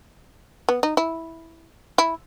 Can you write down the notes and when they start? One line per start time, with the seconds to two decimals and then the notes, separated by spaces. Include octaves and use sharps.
0.69 B3
0.83 D#4
0.97 E4
1.98 E4